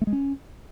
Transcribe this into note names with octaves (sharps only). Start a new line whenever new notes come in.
A3
G#3
C#4